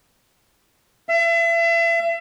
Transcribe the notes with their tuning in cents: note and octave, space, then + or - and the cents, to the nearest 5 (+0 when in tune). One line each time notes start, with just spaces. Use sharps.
E5 +35